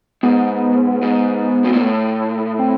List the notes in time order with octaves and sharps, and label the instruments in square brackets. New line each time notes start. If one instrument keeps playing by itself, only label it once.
[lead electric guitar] G#2 [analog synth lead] B3
[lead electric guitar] G#2
B2
A#2
A2
[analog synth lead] C4